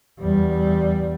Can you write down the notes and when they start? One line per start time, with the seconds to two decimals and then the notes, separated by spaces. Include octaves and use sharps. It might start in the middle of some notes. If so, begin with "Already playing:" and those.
0.21 E2 G3